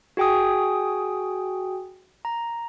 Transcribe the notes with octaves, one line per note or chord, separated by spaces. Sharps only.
F#4 G#4 G5 G#5 D#6
A#5